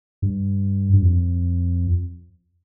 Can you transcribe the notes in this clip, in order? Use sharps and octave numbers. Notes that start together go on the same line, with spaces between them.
G2
G2
F2